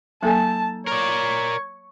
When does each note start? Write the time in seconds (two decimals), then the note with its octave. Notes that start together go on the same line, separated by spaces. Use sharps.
0.23 F#3 A#3 D#4 A4 G#5 A5
0.87 A#4 C#5 D5